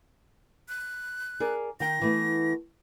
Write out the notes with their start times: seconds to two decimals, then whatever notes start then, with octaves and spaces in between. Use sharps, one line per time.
0.69 F#6
1.40 G#4 A#4 D5
1.80 D#3 G5 A#6
2.01 E3 A3 B3